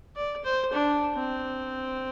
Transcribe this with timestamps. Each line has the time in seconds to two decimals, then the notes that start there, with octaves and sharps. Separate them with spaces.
0.16 D5
0.44 C5
0.73 D4
1.15 C4